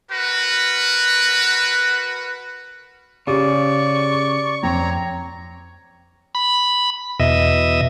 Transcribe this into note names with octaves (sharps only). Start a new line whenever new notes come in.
F#4 A#4 B4
C#3 G4 D5 C#6
F2 C4 C#5 A#5
B5
E2 B2 D#5 E5